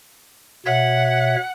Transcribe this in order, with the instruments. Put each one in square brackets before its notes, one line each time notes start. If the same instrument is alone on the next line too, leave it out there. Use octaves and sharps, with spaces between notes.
[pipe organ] B2 C#5 E5 [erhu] F#5